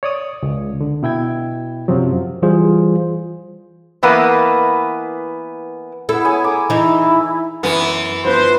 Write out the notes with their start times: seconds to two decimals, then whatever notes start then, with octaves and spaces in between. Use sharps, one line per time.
0.03 C#5 D5 D#6
0.43 C#2
0.81 D3
1.03 B2 E4 G5 G#6
1.88 F#2 C3 F3 F#3
2.42 E3 G3 F4 G#4 C5
4.03 E3 A#3 B3 B4
6.09 B3 E4 A4
6.25 G#4 C#5 G#5
6.44 A#5 D6
6.70 E3 D#4 E4
7.63 F#2 E3 B3 B5
8.25 G1 F3 B4 C5